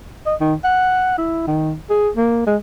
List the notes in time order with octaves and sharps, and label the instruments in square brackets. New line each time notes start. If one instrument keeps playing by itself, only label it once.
[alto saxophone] D#5
D#3
F#5
E4
D#3
G#4
A#3
G#3